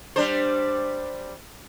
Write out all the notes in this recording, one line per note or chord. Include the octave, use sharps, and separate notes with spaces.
G3 D4 C5